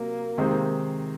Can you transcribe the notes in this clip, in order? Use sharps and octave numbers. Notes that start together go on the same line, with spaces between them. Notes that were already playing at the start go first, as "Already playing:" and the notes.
Already playing: C3 F#3 A#3
C3 D#3 G#3 C4 D#4